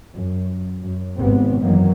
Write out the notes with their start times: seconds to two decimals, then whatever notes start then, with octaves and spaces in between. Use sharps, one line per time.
0.13 F#2
0.83 F#2
1.18 G#1 C3 B3 C4
1.60 F#2 D#3 E3 F#3 A#3